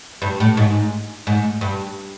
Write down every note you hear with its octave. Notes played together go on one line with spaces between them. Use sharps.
G2
A2
G#2
G#2
G2